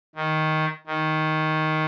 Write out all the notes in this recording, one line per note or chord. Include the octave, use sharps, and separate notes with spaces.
D#3
D#3